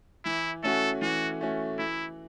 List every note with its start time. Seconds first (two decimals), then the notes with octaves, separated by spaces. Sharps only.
0.25 E3 E4
0.63 A3 C#4 F#4 A4
1.01 E3 F#4
1.41 A3 C#4 F#4
1.79 E3 E4